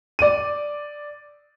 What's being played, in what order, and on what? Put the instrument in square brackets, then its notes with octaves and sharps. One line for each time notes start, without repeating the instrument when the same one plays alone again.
[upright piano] D5 D#7